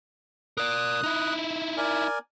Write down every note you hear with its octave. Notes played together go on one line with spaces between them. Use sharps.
A#4 D5 D#6 F#6
D#4 E4
A#4 D5 G#5